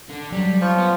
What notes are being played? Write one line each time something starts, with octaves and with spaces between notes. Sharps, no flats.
D3
F#3 G3
F3 C#5
B3